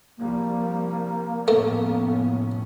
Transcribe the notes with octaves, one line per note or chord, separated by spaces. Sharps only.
C2 F3 G3 A#3
F1 A2 A3 B3 C#4